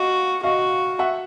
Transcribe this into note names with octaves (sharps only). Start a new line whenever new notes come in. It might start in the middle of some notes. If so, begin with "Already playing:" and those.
Already playing: F#4 D#5 F5
F#4 D#5 F5
E5 F#5